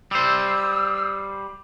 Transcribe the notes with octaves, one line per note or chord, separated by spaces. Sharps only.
G3 C5 E6